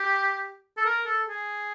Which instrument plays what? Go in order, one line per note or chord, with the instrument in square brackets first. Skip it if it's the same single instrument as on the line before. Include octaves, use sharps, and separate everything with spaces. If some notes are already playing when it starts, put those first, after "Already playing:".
Already playing: [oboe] G4
A4
A#4
A4
G#4